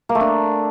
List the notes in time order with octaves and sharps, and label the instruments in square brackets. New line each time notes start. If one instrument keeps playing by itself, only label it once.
[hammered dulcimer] A#3
A3
D4